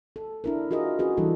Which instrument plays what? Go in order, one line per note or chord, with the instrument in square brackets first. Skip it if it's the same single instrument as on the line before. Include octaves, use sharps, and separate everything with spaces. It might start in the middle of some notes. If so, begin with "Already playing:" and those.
[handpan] A4
D4 E4 A#4
F4 F#4 G#4 A#4 D#5
C#4 F#4 G#4 B4
E3 G3 D4 A4